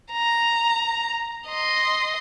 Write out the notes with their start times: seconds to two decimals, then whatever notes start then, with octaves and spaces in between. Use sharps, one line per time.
0.13 A#5
1.47 D#5 C6